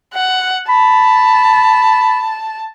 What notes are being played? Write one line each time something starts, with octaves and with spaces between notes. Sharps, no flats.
F#5
A5 B5